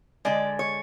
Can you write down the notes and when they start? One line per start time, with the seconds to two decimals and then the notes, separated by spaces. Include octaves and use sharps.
0.25 D3 G#3 D5
0.59 C#5